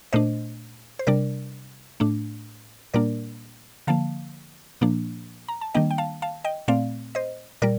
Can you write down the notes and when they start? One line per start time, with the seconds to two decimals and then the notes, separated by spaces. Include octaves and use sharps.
0.13 A#2 A3 D4 C5 D#5
0.99 C5
1.07 C3 G3 D4 A#4 D5
2.00 A2 A3 D4
2.94 A#2 G3 A#3 D4 A#4 D5
3.87 D3 F3 A#3 F5 A5
4.81 A#2 F3 A#3 D4
5.48 A#5
5.61 A5
5.74 D#3 G3 A#3 D4 D#5 G5
5.91 G5
5.98 F5 A5
6.22 F5 A5
6.44 D#5 G5
6.68 A#2 A3 C4 D5 F5
7.15 C5 D#5
7.62 A#2 G3 A#4 D5